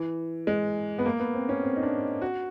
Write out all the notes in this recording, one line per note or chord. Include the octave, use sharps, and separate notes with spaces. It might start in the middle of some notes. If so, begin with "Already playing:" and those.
Already playing: E3
G#3
B3
A#3
B3
C4
C#4
C4
D#4
D4
F#4